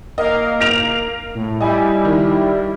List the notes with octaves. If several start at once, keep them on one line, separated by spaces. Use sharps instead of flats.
A#3 A#4 D#5 F5
A#6 D7 F7
A2
G3 E4 D#5 G#5
D#3